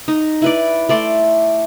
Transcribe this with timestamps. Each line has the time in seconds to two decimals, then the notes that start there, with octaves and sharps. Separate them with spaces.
0.08 D#4
0.42 E4 B4 D5
0.89 A3 D5 C6